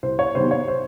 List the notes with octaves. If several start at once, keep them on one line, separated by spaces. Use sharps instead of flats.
C2 C5
C#5
C3 D#3 F#3 B3 C5
C#5
C5